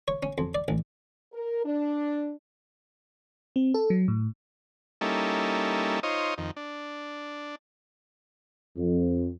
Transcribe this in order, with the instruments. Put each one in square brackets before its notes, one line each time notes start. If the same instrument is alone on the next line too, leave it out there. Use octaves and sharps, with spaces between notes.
[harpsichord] C#5
C#4
F2
D5
A1
[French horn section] A#4
D4
[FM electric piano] C4
A4
F#3
A2
[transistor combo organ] G3 A#3 C#4 D#4 E4 A4
D#4 F4 C5 C#5 D#5
F2 D#3
D4
[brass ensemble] F2